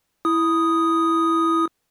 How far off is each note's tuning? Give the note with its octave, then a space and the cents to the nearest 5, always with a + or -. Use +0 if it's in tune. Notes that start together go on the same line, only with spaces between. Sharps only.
E4 +0 D#6 +0